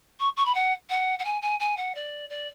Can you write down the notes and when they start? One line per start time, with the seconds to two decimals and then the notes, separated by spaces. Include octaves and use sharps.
0.20 C#6
0.37 C#6
0.45 B5
0.54 F#5
0.89 F#5
1.19 F#5
1.25 G#5
1.42 G#5
1.60 G#5
1.77 F#5
1.95 D5
2.30 D5